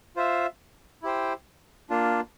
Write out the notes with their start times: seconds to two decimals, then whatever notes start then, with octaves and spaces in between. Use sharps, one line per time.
0.16 F4 C5 E5
1.03 E4 G4 C5 G5
1.90 A#3 D4 F4